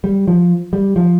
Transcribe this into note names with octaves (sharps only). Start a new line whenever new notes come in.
G3
F3
G3
F3